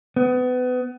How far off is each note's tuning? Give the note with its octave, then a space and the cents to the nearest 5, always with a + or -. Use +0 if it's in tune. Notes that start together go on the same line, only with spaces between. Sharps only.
B3 +30